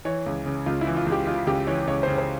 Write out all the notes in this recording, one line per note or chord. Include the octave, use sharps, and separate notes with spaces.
E3 C#5
C#2
C#3
C#2 F4
E4
E3
F4
C#2
G4
C#3 F4
C#2 G4
E3 C#5
C#2 C#5
C#3 C5
C5